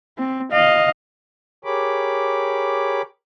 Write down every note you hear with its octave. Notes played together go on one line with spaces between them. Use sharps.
C4
D#5 F5
G4 G#4 A#4 C#5 B5 D6